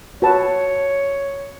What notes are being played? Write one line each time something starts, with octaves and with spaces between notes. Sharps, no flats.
F#4 B4 C#5 A5